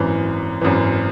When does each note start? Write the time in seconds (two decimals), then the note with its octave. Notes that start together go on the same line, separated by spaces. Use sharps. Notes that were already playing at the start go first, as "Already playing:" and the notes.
Already playing: G#1 F#2 E3
0.61 G#1 F#2 E3